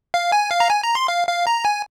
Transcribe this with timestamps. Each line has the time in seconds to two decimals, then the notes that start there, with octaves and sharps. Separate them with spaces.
0.14 F5
0.32 G#5
0.51 F5
0.60 A#5
0.70 G#5
0.83 A#5
0.95 C6
1.08 F5
1.28 F5
1.47 A#5
1.65 G#5